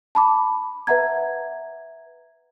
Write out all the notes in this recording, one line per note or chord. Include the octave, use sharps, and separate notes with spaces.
A5 B5 D6
B4 E5 F#5 A#5 G#6